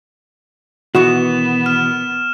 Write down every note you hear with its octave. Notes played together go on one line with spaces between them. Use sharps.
B2 D#3 E3 B3 F#4 E7
F6 E7